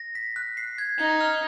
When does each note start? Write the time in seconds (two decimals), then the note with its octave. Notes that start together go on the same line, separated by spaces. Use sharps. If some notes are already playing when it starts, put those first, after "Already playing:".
Already playing: A#6
0.15 B6
0.36 F#6
0.57 C7
0.78 G#6
0.99 D#4 G#6
1.21 F6